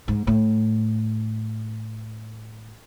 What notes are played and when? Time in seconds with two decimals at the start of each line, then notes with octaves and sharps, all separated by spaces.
0.08 G#2
0.27 A2